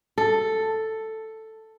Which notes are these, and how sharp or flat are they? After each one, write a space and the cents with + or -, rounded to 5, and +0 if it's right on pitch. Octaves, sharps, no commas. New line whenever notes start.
A4 +5